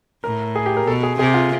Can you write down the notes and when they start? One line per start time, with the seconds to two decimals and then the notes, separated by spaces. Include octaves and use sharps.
0.24 A2 A#4
0.55 G#4
0.66 G4
0.77 A#4
0.87 B2 A4
1.03 G#4
1.19 C3 G#4
1.34 F4